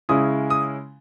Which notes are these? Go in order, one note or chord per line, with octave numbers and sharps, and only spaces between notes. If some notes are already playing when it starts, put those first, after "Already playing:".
C#3 G#3 C#4 E4 D#6
D#6